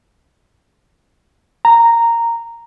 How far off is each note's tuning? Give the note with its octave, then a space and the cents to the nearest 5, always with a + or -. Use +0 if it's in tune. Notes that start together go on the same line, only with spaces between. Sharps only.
A#5 -10